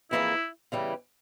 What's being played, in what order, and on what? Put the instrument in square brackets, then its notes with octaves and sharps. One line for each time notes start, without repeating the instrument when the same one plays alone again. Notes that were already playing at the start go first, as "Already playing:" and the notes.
[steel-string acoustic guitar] F2 E3 A#3 F4 G#4 [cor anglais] E4
[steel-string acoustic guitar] C#3 E3 G3